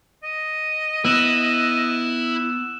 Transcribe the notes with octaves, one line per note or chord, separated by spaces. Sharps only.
D#5
B3 E4 E6 F#6 E7